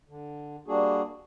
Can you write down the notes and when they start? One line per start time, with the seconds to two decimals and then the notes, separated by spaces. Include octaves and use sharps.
0.08 D3
0.68 G3 A#3 D4 F#4 G#4